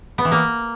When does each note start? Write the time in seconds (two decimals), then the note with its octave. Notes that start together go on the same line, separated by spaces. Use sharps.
0.18 B3
0.25 E3
0.31 A#3